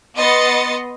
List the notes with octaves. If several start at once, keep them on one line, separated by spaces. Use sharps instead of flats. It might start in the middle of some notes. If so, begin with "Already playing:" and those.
B3 D#5 C6 A6 C#7